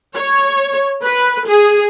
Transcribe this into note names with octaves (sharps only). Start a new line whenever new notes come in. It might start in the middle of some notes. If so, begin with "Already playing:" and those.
C#5
B4
G#4